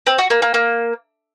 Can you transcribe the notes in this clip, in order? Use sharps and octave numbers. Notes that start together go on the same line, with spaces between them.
C4
F#4
A#3
A#3
A#3